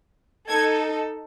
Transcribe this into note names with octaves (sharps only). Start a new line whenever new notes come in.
D#4 A4 G#6